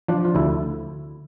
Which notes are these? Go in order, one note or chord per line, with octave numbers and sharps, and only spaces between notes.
F3 D4
F4
D2 E4